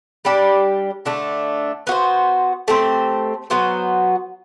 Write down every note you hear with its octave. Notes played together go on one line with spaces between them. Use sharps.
G3 D4 G4 D5
D3 A3 D4
B3 F#4 C5
A3 C4 G4 C5
F#3 B3 F#4 C5